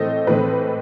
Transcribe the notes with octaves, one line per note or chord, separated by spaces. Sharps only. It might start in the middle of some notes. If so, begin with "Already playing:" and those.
Already playing: A2 E3 A3 C4 D#5
A2 E3 A3 C4 B4